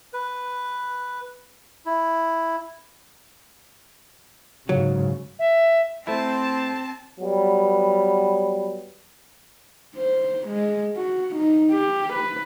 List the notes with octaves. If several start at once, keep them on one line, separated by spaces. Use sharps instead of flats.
B4
E4
G#2 C#3 F#3
E5
A3 C4 E4 C5 A5
F#3 G3 B3
C5
G#3
F#4
D#4
G4
B4